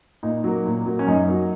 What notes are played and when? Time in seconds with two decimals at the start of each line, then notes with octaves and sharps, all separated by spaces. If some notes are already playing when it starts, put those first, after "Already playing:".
0.23 A#2 D#4
0.44 F#3 A#3
0.66 A#2
0.86 F#3 A#3
0.99 C#4
1.07 F#2 D#4
1.28 F#3 A#3